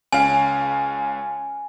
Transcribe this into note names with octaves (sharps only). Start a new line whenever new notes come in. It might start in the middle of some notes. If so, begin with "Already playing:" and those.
C#2 C#4 F5 G#5